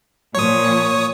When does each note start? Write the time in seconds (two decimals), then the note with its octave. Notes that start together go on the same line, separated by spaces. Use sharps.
0.35 A#2 F3 C#5 D#6